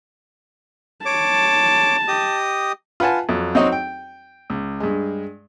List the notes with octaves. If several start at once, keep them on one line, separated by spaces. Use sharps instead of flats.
C#5 A5 D6
G4 D#5 D#6
F4 B4 F#5 G#5 A5
F2 F#3
F#3 C4 D#4 F#4 C#5 D#5
G5
C#2
G2 G#3